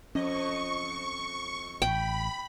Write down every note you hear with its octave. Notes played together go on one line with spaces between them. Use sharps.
F2 C#4 D#5 C#6
A1 G5 B5